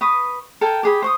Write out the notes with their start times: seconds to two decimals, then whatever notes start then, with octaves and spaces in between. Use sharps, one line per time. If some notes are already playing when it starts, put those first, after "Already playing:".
0.01 B4 C#6 D#6
0.61 A4 A#4 G5 G#5
0.83 G4 G#4 B5
1.02 C5 C#6 D#6